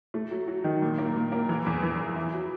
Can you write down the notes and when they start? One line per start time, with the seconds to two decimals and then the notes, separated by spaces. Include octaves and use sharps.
0.14 A3
0.31 F#3
0.48 F#3
0.64 D#3
0.82 A#2
0.98 A#3
1.16 A#2
1.32 A#3
1.49 E3
1.66 E2
1.83 E3
2.00 E2
2.16 E4
2.34 F#3